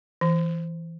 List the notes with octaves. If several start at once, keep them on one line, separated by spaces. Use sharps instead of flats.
E3